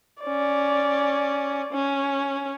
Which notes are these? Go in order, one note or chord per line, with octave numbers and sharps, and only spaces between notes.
C#4 D5
C#4